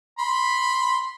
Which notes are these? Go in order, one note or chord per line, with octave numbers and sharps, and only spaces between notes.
B5 C6